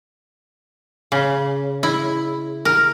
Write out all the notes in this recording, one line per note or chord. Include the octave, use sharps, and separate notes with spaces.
C#3
E4
A#4